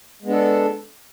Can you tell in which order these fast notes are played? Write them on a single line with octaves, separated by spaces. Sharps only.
G#3 B3 D4 A4